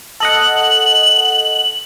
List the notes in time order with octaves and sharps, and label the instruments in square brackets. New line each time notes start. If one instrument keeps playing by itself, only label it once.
[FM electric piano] A4 D#5 F#5 [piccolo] F#7